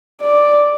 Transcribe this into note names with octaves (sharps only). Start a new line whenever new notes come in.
D5